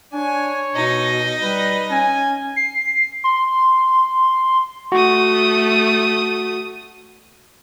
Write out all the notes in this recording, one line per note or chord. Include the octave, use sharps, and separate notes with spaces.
D4 C#5 G#5
B2 D#4 D#5
G3 B4
C#4 G#5
C7
C6
A3 F#4 D#6